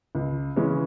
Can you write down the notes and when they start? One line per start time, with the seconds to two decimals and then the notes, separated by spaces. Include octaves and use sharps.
0.15 C#2
0.56 C#3 E3 G#3 C#4